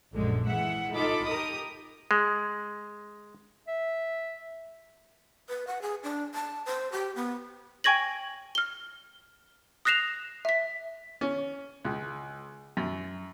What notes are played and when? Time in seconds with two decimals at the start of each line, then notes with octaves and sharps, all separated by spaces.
0.15 A#1 F#2 D3 G#3
0.48 E3 G#3 E5 F#5
0.92 D#4 F4 A4 B5 D6
1.28 G4 A#4 D#6
2.11 G#3
3.68 E5
5.49 B4
5.67 F#5
5.82 G#4
6.03 D4
6.34 A5
6.66 C5
6.92 G4
7.16 B3
7.84 G5 G#5 C#6 G#6 A#6 F#7
8.55 F6 G7
9.85 D#6 F#6 A#6 C7 E7 F7
10.45 E5 B6
11.21 C#4
11.85 C#2
12.77 F#2